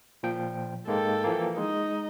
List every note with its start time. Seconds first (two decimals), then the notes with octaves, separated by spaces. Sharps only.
0.23 A#2 F3 G5
0.87 G#2 G#3 A#3 A4 G5
1.24 E3 F3 A#3
1.57 G#3 D#4 D#5